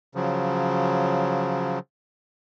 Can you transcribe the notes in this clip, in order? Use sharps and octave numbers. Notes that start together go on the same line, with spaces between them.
C#3 F3 F#3